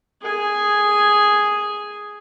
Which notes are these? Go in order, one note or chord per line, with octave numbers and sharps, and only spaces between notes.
G#4 G#5